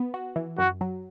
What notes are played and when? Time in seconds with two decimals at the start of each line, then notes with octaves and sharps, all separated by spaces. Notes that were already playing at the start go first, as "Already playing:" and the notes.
Already playing: B3
0.14 F#4
0.36 E3
0.58 F#2 F#4
0.81 F#3